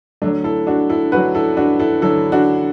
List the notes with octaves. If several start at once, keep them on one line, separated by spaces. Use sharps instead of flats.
D2 D3 F#3 A3 D4
E4 A4
D4 F#4
E4 A4
D2 D3 F#3 F#4 B4
E4 A4
D4 F#4
E4 A4
D2 D3 F#3 E4 A4
D4 F#4